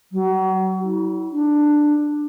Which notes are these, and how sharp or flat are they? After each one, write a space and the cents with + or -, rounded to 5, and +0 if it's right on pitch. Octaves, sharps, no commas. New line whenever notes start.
F#3 +35
E4 -30
D4 +10